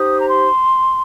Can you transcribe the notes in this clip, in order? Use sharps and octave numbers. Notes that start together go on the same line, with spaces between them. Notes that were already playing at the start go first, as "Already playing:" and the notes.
Already playing: D#4 G4 C5 D#6
A#5
C6